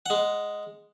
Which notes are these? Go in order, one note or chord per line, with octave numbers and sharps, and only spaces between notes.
G#3 F#5